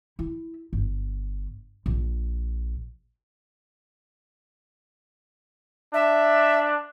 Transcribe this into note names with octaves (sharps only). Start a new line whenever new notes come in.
E4
G1
A#1
D4 E5